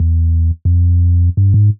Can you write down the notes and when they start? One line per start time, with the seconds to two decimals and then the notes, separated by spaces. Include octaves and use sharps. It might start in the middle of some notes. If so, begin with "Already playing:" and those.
Already playing: E2
0.65 F2
1.37 G2
1.54 G#2